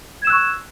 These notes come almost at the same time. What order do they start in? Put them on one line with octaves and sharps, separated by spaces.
G#6 E7 E6 F#6 C#6